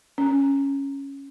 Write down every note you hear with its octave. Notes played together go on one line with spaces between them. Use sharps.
C#4